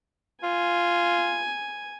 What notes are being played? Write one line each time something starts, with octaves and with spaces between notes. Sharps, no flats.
F4 G#5